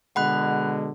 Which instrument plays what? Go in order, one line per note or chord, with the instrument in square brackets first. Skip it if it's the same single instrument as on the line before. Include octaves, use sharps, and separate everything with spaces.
[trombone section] B2 D3 G#3 [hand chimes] F#5 B5 F#6